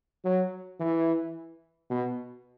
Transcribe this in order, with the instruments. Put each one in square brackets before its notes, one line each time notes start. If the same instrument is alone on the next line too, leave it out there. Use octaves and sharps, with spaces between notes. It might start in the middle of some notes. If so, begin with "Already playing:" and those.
[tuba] F#3
E3
B2